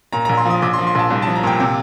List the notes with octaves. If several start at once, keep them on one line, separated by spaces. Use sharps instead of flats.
A#2 A#5
A#1 A#5
C6
F3 D#6
A#1 D6
C6
F3
C6
A#1 A5
C2
F3 A5
A#5
A#2 G5
C3 G5